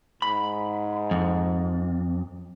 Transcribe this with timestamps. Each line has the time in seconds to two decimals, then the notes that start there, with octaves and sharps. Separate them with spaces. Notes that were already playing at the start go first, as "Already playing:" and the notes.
0.22 G#2 B5
1.11 F2